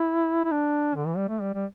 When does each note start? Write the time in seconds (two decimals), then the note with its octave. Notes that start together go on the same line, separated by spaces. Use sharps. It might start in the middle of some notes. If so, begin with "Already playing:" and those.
Already playing: E4
0.44 E4
0.52 D4
0.95 D3
1.07 E3
1.17 G3
1.29 A3
1.41 G3
1.54 G3